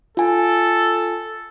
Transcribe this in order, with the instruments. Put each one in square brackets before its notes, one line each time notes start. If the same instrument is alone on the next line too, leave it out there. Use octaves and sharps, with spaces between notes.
[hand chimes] F4 G#5 [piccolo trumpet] A4